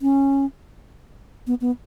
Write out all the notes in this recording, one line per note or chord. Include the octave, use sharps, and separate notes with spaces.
C#4
B3
B3